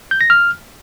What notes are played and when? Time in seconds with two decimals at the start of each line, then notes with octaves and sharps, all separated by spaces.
0.11 G6
0.21 A#6
0.30 F6